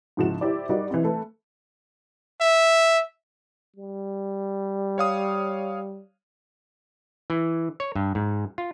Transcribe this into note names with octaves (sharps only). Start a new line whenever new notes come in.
G#2 C#3 F3 E4 F#4 E7
E4 G4 C5 D5
G3 D#4 F#4 A#4 D5 D#5
E3 C4
A3 A4 B4
E5
G3
C#5 F5 D#6
E3
C#5
G2
G#2
F4